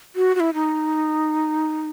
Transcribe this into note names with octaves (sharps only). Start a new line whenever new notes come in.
F#4
F#4
E4
D#4